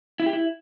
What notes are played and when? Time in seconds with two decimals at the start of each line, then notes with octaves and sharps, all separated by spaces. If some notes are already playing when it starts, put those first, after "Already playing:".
0.20 E4
0.26 G4
0.33 E4